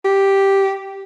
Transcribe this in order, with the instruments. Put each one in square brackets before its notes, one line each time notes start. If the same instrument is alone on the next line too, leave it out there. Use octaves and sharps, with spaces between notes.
[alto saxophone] G4